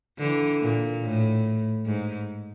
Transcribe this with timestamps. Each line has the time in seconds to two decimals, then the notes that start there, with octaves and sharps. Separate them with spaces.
0.19 D3 E3
0.62 A#2
1.04 A2
1.86 G#2